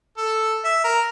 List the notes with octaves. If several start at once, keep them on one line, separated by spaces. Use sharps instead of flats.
A4
E5
A#4